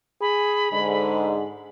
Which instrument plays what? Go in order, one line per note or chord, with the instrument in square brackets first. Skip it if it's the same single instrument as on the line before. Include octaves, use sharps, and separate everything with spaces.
[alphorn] G#4 [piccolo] B5
[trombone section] G#2 D3 [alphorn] G#3